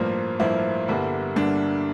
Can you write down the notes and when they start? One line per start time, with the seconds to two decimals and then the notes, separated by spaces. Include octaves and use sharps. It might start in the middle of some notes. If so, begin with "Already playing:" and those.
Already playing: A1 G2 F3 A#3 F4
0.40 A1 G2 F3 A#3 E4
0.88 G1 G2 D3 G3 A#3
1.36 G1 G2 D3 G3 A#3 D4